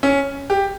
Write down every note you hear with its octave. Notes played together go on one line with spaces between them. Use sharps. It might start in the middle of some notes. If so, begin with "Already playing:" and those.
C#4
G4